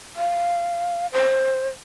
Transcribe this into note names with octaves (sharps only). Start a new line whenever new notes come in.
F5
C5